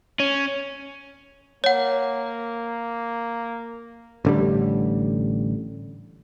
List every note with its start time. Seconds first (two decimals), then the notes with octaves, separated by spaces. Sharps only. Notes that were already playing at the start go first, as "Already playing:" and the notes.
0.20 C#4
1.64 A#3 C#5 F#5
4.25 A1 D3 G3